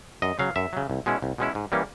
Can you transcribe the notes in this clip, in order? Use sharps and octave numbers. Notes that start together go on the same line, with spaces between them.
F#2 D#5
C#3 F#3 F5
F#2 E5
C#3 F#3
C2
B2 G#3 C#4 E4
C2
B2 G#3 C#4 E4
G#2
E3 G3 A#3 C#4